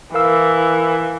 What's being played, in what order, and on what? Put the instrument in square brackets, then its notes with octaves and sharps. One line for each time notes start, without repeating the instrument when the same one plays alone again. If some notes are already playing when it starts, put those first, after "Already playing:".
[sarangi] E3 [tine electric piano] A#4 F5 E6